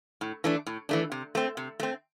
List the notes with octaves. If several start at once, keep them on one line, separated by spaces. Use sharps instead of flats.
A2
E3 A3 D4
A2
E3 A3 D4
C3
A3 C4
C3
A3 C4